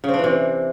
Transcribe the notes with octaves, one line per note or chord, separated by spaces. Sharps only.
C#3
C4
D4
E3
C3